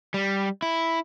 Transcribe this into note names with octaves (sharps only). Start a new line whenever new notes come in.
G3
E4